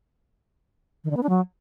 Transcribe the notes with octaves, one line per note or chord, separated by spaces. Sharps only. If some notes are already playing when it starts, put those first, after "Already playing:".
D#3
D3
B3
D4
F#3